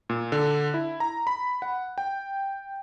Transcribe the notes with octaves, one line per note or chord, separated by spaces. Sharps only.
A#2
D3
E4
A#5
B5
F#5
G5